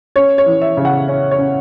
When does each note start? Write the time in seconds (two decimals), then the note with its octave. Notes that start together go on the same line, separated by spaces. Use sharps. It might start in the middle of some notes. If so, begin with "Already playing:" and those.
0.16 C#4 C#5
0.38 C#5
0.46 E3
0.62 E5
0.77 C#3
0.85 F#5
1.08 C#4
1.31 C#5
1.38 C#4